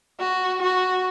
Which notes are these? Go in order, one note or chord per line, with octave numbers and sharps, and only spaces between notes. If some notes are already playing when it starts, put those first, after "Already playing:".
F#4
F#4